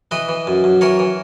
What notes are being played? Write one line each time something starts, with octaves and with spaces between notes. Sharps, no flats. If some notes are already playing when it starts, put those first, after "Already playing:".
E3 B4 D#5
E3
F#2
F#2
E3 A#4 C#5
E3